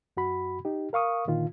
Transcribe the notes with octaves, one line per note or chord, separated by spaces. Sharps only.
F#2 F#4 B5
D#4 G4
A#4 F5 C#6 D#6
A#2 D3 D#3 F4